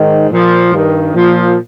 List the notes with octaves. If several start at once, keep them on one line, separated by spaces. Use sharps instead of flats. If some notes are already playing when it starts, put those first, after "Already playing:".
Already playing: G#2 D#3
A#2 F3
G2 D#3
A#2 F3